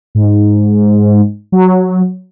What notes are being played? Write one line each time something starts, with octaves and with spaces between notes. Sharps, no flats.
G#2
F#3